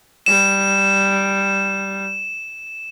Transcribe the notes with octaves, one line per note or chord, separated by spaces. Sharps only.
G3 E7